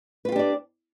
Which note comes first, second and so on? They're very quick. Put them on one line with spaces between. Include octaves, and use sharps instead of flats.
B4 F4 G4 D4 D5